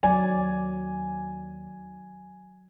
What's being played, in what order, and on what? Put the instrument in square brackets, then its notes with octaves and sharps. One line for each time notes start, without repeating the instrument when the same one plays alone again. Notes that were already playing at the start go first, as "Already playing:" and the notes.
[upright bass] D#2 [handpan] F#3 D5 [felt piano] G#5